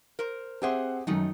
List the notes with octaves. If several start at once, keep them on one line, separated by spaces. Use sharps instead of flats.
A#4 C5
C4 G4 G#4 C5 E5 F#5
F#2 D#3 F#3 A3 D#4